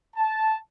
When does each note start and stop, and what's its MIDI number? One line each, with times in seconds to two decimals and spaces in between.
0.16 0.56 81